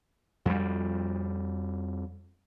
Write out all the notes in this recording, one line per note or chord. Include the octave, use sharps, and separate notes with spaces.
F2 G3